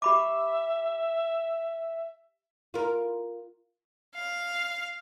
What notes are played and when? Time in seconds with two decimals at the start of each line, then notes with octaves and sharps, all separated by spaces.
0.02 G4 E5 B5 D6
2.74 F4 A#4
4.14 F5